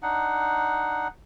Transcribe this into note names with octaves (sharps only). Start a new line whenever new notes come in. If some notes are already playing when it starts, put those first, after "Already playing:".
D4 D#4 F#5